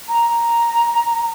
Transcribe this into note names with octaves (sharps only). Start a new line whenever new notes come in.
A#5